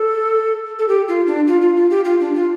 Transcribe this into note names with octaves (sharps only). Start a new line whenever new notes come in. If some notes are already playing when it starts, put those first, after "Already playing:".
Already playing: A4
A4
G4
F4
D4
F4
F4
F4
G4
F4
D4
F4